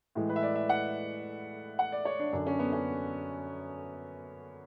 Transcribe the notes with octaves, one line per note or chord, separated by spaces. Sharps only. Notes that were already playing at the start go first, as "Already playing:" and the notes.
A2 E3 G#3
B4
E5
D5
E5
F#5
F#5
D5
C#5
D4
F#2 D3 F#3 D4
C#4
B3
C#4